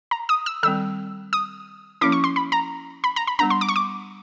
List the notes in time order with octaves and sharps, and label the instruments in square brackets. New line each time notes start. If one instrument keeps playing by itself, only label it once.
[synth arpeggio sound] A#5
D#6
E6
[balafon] D#3 G3 C4 [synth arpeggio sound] E6
[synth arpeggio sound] D#6
[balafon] F3 A#3 C#4 E4 [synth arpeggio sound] D6
[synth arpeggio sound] C#6
C6
B5
A#5
B5
A#5
B5
[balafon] G3 B3 D4 [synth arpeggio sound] A#5
[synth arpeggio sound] C6
D6
C#6
D6